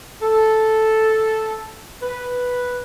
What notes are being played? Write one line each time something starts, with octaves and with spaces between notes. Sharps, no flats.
A4
B4